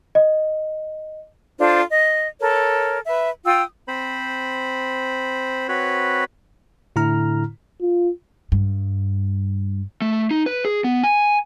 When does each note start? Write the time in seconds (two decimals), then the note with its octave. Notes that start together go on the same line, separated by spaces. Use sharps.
0.15 D#5
1.59 D4 F4 A4 C5
1.89 D#5
2.41 A4 A#4 C#5
3.07 B4 E5
3.44 F4 G5 D#6 E6
3.88 C4 C5 B5
5.69 C4 F#4 B4 C#5 B5
6.96 A2 D3 E4 A#5 F6
7.81 F4
8.52 G2
10.02 A3
10.31 D#4
10.46 B4
10.65 G#4
10.84 B3
11.03 G#5